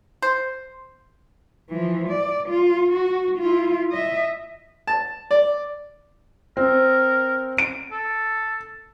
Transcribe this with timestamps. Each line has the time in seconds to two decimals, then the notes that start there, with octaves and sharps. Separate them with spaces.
0.22 C5
1.70 E3 F3
2.09 D5
2.49 F4
2.93 F#4
3.38 E4 F4
3.91 D#5 E5
4.87 A5
5.31 D5
6.57 C4 A#4
7.58 D7
7.91 A4